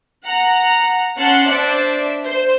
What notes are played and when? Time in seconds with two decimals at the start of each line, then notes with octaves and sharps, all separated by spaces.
0.24 F#5 A#5
1.18 C#4 F#5 A5 C6 F#6 C#7
1.49 D4 C5 D5 E5
2.25 C5